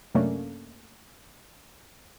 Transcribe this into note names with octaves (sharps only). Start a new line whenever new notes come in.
F#2 C3 A3 A#3 C#4 D4